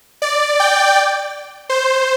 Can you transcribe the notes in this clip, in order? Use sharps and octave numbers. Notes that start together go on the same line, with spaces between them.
D5
G5
C5